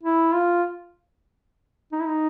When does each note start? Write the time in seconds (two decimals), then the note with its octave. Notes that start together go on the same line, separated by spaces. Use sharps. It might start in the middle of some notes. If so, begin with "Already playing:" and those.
0.04 E4
0.35 F4
1.92 D#4
2.00 E4
2.06 D#4